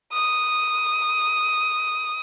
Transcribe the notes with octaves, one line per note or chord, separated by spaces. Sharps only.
D#6